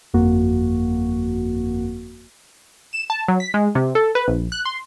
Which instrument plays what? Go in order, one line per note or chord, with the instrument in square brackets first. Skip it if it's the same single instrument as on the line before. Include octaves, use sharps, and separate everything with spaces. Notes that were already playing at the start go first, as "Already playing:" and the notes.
[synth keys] G1 F2 A#3 F#4
[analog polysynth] E7
A5
F#3
B6
G#3
C3
A4
B4
A#1
F#6
C6